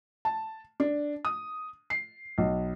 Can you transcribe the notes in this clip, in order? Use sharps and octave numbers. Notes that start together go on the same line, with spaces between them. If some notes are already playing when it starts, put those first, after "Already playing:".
A5
D4
D#6
C7
B1